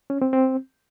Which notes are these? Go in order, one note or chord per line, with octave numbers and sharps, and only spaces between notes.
C#4
C4
C4